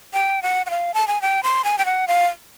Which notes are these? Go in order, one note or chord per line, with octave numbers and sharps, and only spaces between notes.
G5
F#5
F#5
F5
A5
G#5
G5
C6
G#5
G5
F#5
F5